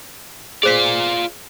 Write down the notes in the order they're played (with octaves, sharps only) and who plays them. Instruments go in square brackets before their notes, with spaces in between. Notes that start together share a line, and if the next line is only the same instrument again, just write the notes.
[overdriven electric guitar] F4 D5 [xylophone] G#4 C5 B6